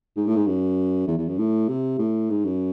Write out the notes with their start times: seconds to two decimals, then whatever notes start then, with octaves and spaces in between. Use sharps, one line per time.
0.16 G#2
0.27 A2
0.36 G#2
0.47 F#2
1.07 E2
1.18 E2
1.28 F#2
1.38 A2
1.68 C3
1.98 A2
2.30 G#2
2.45 F#2